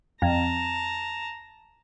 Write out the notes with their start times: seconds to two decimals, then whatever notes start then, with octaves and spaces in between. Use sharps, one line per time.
0.22 F2 A5 A#5